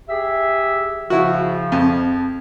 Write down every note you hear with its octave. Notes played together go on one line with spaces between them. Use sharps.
G4 G#4 E5
C#3 F3 E4 F#4
F2